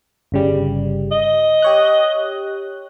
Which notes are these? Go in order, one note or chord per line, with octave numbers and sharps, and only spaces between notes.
G1 C#3 G3
D#5
G4 C#5 F#6